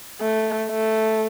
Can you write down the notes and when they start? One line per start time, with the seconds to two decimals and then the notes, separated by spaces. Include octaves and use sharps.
0.21 A3
0.70 A3